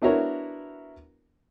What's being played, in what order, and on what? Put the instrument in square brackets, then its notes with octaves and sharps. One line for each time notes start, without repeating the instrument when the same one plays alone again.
[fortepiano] B3 D4 E4 F#4 A#4 C#5